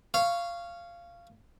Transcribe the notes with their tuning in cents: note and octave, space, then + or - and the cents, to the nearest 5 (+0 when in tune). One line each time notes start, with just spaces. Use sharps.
C#5 +0 F5 -15